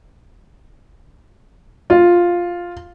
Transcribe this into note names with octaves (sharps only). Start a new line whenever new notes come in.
F4